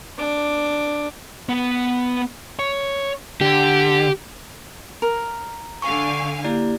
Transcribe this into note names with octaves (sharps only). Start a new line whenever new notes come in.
D4 D6
B3 B4
C#5
D3 G4
A#4
D3 F5 G#5 C#6
A#3 E4 G4 D5